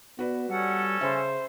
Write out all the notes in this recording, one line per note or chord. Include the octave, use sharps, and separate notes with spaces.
B3 F#4 B4 D5
G3 C#4 A4 F#5
C#3 C5 E5 G#5 B5